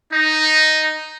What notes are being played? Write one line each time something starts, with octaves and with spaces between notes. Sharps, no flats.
D#4